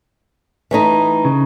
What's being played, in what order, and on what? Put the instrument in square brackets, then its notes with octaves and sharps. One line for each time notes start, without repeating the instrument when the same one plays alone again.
[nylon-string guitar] E3 A3 D#4
[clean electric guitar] C#3